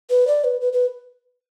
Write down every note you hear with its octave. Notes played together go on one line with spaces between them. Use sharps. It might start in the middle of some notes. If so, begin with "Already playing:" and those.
B4
D5
B4
B4
B4